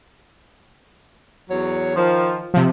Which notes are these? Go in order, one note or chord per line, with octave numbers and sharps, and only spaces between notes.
E2 F#3 C#5
D#3 F3
C3 F3